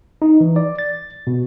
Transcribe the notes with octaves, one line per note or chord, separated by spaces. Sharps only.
D#4
E3
D5
A6
B2